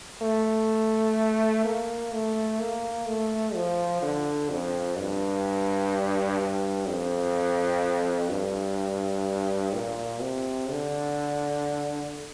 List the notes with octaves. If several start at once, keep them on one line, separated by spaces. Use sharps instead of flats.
A3
A#3
A3
A#3
A3
F3
D3
F2
G2
G2
F2
G2
A#2
C3
D3